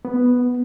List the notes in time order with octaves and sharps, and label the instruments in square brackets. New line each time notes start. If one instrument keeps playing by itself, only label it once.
[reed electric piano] B3